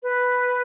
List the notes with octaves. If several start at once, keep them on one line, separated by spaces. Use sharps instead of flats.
B4